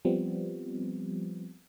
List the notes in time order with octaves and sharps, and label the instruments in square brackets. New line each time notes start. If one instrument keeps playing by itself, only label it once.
[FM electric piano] F3 G3 B3 C4